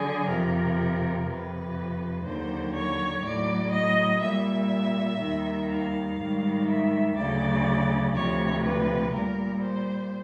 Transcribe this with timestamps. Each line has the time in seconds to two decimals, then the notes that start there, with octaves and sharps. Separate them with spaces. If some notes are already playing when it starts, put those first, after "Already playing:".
Already playing: D3 F#3 G#4
0.28 F2 C3 F3 A#4
1.26 F2 C3 F3 B4
2.25 D#2 D3 F#3 C5
2.74 C#5
3.23 A2 F#3 D5
3.73 D#5
4.22 A#2 G3 E5
5.20 D#2 D#3 G3
5.69 F5
6.18 G#2 D#3 G3
6.67 E5
7.16 D2 C#3 F#3 D5
8.15 D2 C3 F3 C#5
8.64 B4
9.13 A#2 G3 A#4
9.62 C5